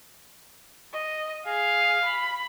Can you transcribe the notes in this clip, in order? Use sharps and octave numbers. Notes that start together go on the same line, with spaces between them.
D#5
G#4 F5
B5